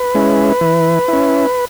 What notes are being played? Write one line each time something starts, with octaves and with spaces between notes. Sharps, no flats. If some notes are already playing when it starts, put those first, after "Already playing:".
Already playing: B4
G#3 C#4 E4
E3
C#4 E4